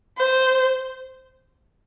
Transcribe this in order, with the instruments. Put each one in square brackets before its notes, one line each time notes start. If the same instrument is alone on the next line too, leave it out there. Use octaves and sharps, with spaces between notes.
[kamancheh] C5